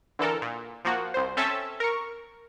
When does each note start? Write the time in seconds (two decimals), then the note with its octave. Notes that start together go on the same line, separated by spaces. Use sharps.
0.19 D3 E3 A4 A#4
0.42 A#2
0.85 F3 A#3 F#4
1.14 C2 C5
1.37 C4 C#4 A4 E5 A5
1.80 A#4 C#6